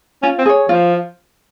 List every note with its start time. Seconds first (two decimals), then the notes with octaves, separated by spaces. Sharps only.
0.23 C#4 F4
0.39 C4
0.46 G#4 C#5
0.69 F3 F4